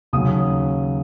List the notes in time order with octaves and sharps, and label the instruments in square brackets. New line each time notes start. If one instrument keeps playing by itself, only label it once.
[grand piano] D#2 C#3 F#3 C#4 D#6